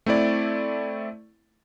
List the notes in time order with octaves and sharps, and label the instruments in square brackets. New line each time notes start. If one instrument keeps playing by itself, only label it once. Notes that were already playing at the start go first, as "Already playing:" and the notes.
[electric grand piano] A3 C4 E4 D5